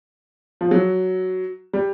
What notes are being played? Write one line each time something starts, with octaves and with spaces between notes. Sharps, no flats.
F3
F#3
G3